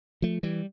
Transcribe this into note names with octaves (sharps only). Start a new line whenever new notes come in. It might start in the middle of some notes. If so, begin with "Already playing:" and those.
F3 A3
E3 G3